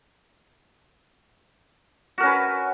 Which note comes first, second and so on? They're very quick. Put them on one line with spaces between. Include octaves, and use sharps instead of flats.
F#4 A#4 C#4 B4